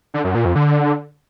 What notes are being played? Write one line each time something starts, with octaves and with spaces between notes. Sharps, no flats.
D3
F#2
A#2
F2
D3